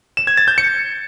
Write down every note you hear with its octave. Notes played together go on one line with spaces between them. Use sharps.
E7
G#6
A6
G6
C#7